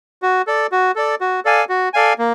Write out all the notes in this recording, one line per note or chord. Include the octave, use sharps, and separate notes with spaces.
F#4
A4 D5
F#4
A4 D5
F#4
A4 D5 F5 G#5
F#4
A4 D5 F5 G#5
A#3